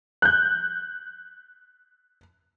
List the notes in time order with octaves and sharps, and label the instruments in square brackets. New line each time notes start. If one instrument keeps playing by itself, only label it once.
[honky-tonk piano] F#6 G6